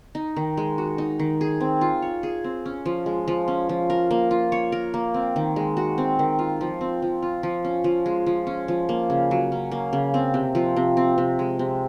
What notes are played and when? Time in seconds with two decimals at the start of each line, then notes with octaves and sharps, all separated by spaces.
0.15 D#4
0.36 D#3
0.57 G#3
0.78 F#4
0.98 D#4
1.19 D#3
1.41 G#4
1.60 C4
1.81 F4
2.02 C#5
2.23 G#4
2.44 C4
2.66 C#4
2.86 F3
3.06 G#3
3.28 F3
3.48 C#4
3.69 F3
3.90 A#4
4.11 A#3
4.31 F4
4.52 C#5
4.72 A#4
4.94 A#3
5.14 C4
5.36 D#3
5.56 G#3
5.77 F#4
5.98 C4
6.19 D#3
6.39 F4
6.61 F3
6.81 C4
7.02 F3
7.22 F4
7.43 F3
7.65 C#4
7.84 F3
8.06 G#3
8.27 F3
8.47 C#4
8.68 F3
8.89 A#3
9.10 C#3
9.31 F#3
9.52 C#4
9.72 A#3
9.93 C#3
10.14 C4
10.34 C3
10.55 F3
10.77 C3
10.97 C4
11.18 C3
11.39 G#3
11.59 C3